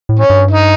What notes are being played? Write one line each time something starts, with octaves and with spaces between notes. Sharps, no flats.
A2
C#4
G2
D#4